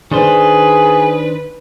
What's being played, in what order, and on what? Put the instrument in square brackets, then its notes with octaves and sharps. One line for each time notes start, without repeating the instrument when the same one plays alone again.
[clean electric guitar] D#3 D4 C5 [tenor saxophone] G#4 [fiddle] B4